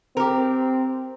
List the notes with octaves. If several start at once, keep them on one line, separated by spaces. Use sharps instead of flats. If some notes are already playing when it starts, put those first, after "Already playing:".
C4 G4 A#4